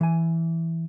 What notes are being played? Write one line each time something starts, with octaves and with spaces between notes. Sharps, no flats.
E3 G#5